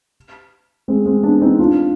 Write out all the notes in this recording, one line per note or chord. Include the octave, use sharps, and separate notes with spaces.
G#3 C4
G#3 C4
B3 D4
C4 D#4
D4 F4